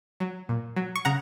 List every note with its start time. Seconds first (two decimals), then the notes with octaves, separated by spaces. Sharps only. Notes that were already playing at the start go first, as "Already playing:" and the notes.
0.20 F#3
0.49 A#2
0.76 F#3
0.96 C#6
1.05 C#3 F#5 A#5